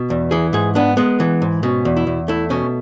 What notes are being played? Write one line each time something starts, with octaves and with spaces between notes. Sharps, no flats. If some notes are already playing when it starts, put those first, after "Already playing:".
Already playing: B2
E2
E3 G#4
G#2 G#4
B3 D4
G#3 B3
E3
G#2
B2 C#4
E2
E4
E2
A3 E4
B2 C#4